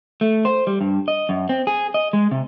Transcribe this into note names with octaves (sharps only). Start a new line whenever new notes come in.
A3
C5
G3
G2
D#5
F#2
C4
G#4
D#5
G#3
C3